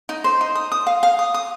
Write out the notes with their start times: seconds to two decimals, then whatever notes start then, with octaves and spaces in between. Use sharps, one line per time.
0.09 D#4
0.24 C5
0.41 D#4
0.55 D#6
0.72 D#6
0.87 F5
1.03 F5
1.19 D#6
1.34 D#6